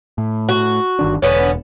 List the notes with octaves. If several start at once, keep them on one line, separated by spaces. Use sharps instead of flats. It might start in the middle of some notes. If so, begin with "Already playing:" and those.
A2
F#4
G1 D#3 D4
E1 D3 B3 C#4